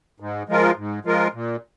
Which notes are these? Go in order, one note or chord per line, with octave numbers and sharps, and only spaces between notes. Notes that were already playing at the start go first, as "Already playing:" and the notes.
G#2
F3 G#3 F4 A#4
G#2
F3 G#3 F4 A#4
A#2